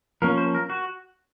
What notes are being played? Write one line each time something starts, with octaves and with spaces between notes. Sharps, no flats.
F3 A#3 C#4 A#4
C5
A#4
F#4